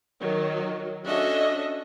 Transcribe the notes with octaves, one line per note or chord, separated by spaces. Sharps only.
D#3 F#3
C#4 D4 F#4 A4 D#5 E5